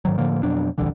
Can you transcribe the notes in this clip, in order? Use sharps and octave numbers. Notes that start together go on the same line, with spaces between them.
G#2 D#3 F#3
A2 D3 F3 A#3
F2 B2 F#3 D4
D#1 C2 D3 E3